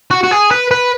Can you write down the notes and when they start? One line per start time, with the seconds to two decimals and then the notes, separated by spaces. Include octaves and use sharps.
0.11 F#4
0.24 F#4
0.31 G#4
0.51 B4
0.71 B4